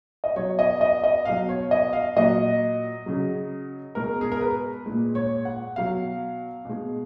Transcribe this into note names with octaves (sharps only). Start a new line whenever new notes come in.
D#5
B2 F#3 C#5
D#5
D#5
D#5
B2 F#3 F5
C#5
D#5
F5
A#2 F#3 D#5
C#3 F#3
B2 G#3 A#4
G#4
A#4
B4
A#2 G#3
C#5
F#5
B2 F#3 F5
B2 G#3